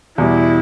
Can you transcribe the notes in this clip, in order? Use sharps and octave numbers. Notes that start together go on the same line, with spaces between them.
E2 B2 G3 E4